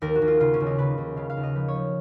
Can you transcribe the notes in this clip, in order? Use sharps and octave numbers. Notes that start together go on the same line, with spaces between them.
D#2 A#4
F#4
D#2
F4
C#3 F4
C#4
D#2
D#4
C#3 B4
D#2
C#3 F5
F5
D#2
D#5
F3 B4
C#5
F3